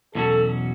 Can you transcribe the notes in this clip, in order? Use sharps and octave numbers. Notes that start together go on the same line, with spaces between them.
E2 B2 F#3 C#4 F#4 A4